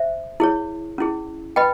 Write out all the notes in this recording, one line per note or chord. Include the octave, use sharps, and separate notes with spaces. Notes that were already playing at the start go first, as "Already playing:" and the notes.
Already playing: C5 E5
E4 G#4 C#5
C#4 E4 G#4
B4 D#5 G5 B5